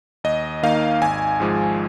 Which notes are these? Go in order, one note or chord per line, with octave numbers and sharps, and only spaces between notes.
D#2 D#5
D#3 A#3 D#4 F5
G#1 G#5
G#2 F3 G#3